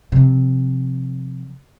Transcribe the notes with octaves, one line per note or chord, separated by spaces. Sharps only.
C3 F3